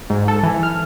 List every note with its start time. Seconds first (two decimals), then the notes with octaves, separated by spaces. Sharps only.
0.10 G#2
0.28 A4
0.43 E3
0.63 F6